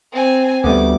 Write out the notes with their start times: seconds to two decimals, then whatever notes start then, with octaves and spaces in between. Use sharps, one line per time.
0.13 C4 G#5
0.64 D2 G3 A3 B3 D6